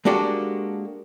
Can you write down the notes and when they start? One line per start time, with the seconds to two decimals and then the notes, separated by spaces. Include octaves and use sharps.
0.05 G#3 A#3 D4 F#4 G4 A4